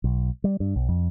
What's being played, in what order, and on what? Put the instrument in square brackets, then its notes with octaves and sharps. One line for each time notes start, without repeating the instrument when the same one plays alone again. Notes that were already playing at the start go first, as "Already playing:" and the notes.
[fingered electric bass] B1
G3
G2
B1
F2